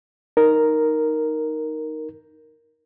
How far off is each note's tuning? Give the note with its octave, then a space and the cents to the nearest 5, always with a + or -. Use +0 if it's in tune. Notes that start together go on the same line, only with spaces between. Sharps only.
D#4 +0 A#4 +0